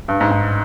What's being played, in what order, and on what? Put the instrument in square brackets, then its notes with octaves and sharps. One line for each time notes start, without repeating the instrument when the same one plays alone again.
[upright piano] G2
G#2
G#2